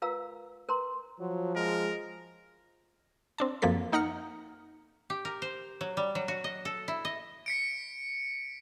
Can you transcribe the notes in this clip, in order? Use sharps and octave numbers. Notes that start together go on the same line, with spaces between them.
F4 A#4 B4 F5 A#5 E6
A#4 B4 A#5 C6
F3 F#3
G#3 A#4
C4 D4 A5
F#2 F3 A#3 C4 A4 B6
A#3 D#4 F#5 A#5 F6 C#7
G4
A#4
C5
F#3
G3
F#3
F#4
D#5
A4
E4
D#5
B6 C#7 D7